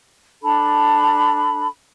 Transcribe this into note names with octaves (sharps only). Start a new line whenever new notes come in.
D4 A4 B5